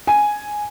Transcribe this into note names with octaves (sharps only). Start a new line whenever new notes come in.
G#5